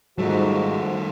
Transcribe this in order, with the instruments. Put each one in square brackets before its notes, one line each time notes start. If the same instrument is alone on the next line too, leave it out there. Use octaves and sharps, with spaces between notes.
[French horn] G#2 [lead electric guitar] D#3 A3 [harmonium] F3 F#4 [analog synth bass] G3